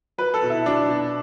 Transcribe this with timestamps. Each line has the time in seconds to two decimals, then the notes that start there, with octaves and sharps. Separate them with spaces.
0.18 F#3 B4
0.34 A4
0.42 B2
0.50 E4
0.66 F#3 D4
0.89 B2